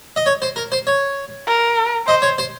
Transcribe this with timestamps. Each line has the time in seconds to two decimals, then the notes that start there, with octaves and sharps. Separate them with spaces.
0.16 D#5
0.26 C#5
0.42 C5
0.56 A#4
0.72 C5
0.87 C#5
1.47 A#4
2.07 C5 D#5
2.22 C#5
2.38 C5